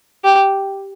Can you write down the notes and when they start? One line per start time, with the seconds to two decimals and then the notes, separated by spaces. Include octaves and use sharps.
0.24 G4